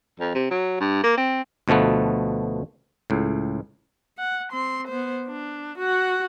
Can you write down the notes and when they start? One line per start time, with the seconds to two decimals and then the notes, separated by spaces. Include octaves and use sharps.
0.20 F2
0.35 C3
0.51 F#3
0.80 G2
1.03 A#3
1.17 C4
1.68 D2 B2 F3 A3 B3
3.10 C#2 A2
4.18 F#5
4.52 C4 C6
4.88 B3 C5
5.27 D4
5.78 F#4 F#5